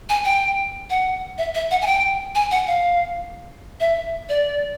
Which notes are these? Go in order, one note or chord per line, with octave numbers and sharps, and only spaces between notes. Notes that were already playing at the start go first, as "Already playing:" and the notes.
G#5
G5
F#5
E5
E5
F#5
G#5
G5
G#5
F#5
F5
E5
D5